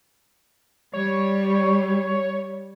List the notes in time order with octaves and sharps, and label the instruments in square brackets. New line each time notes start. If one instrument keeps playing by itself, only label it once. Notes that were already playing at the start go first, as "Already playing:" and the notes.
[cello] G3 [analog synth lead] C#5